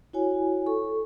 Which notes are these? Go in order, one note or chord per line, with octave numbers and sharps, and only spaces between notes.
E4 F#4 C#5 G#5
A4 C#6